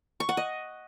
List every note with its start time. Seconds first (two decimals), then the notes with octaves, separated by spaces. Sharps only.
0.20 C#6
0.29 F#5
0.37 D#5